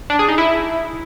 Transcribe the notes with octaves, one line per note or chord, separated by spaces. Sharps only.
D4
G#4
D#4
E4